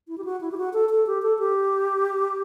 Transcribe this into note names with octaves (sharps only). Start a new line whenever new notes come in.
E4
G4
F#4
E4
G4
F#4
A4
A4
G4
A4
G4